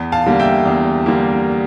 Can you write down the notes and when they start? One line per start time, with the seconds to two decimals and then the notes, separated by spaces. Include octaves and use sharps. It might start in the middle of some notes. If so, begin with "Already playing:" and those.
Already playing: E2
0.12 F5 A5
0.26 D3 G3 A#3
0.39 E5 G5
0.66 E2
1.06 D3 G3 A#3